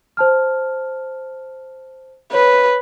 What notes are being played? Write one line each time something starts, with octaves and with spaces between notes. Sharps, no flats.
C5 A5 F6
B4 C#5